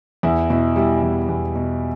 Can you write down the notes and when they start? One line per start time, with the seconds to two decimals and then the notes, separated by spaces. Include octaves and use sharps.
0.23 E2 E4
0.50 B2 E4
0.76 G3 E4
1.02 E2
1.29 E2
1.56 B2